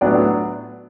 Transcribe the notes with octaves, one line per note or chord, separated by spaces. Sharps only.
A2 F#3 B3 D4 D5 F#5